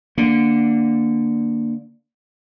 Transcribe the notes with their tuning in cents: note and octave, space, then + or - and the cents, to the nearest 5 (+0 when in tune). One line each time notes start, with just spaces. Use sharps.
D3 +0 A#3 -5